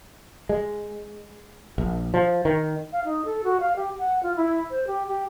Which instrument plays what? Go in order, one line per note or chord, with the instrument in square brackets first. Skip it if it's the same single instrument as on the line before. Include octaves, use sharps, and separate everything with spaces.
[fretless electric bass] G#3
A#1
F3
D#3
[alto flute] F5
D#4
A4
F#4
F5
G4
F#5
F4
E4
C5
G4
G4